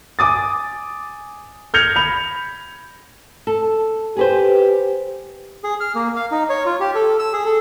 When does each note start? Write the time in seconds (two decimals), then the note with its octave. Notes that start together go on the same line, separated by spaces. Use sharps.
0.19 G#5 D6 D#6 A6
1.74 F6 G6 G#6 A#6 C#7 F7
1.96 B5 F7
3.47 A4
4.17 G4 G#4 B4 C5
5.64 G#4
5.81 F6
5.95 A#3
6.16 F5
6.32 D#4
6.50 C#5
6.65 F4
6.80 G4
6.95 A4
7.19 E6
7.33 G#4
7.46 A4